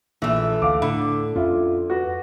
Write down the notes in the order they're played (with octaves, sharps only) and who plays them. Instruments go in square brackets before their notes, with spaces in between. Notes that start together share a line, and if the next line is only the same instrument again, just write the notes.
[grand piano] A#1 [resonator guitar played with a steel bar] E3 A3
[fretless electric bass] D2 [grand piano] F5 D6
[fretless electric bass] A2 [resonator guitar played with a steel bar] D3 [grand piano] B5
[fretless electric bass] F2 C#4 [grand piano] F4 E5
[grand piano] F#4 B4